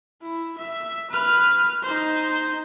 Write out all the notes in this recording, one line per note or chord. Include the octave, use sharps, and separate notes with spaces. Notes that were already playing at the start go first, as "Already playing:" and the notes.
E4
E5
B4 F6
D#4 C5